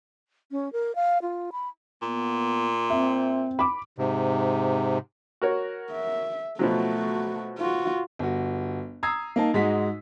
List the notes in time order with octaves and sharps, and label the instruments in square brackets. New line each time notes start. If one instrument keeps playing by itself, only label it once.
[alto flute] C#4
A#4
F5
F4
B5
[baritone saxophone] A#2 [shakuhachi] B3
[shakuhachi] C4 [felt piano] E5
[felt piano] B5 D6
[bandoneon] G#2 C3
[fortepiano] F#4 A#4 C#5
[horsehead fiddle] E5
[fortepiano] B2 F3 F#3 [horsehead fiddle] A3 F#4
[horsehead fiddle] F4 F#4
[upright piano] G1 F#4
A#5 D#6 E6 G#6 C7
A#3 D#4 A5
G#2 G#3 D#4 F#4 B6